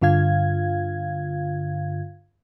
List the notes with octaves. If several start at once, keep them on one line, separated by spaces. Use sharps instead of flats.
G2 D3 F4 F5 G#6